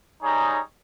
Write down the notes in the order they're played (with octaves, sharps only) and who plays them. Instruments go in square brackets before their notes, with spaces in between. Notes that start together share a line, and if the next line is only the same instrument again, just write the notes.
[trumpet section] G3 D#4 G#4 C#5 A#5